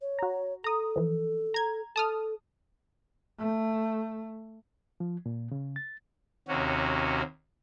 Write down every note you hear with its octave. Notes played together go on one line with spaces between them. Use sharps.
C#5
F#4 A#5
A4 A#5 D#6
E3 F3
A#5 G#6
A4 A5 D#6 F6
A3
F3
A#2
C#3
A6
D#2 C3 C#4 F#4